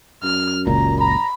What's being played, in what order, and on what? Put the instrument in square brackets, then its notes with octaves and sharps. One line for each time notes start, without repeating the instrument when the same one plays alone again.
[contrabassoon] F#2 [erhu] F6
[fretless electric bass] F#1 C#2 A#2 [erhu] A#5
[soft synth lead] A#5 [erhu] B5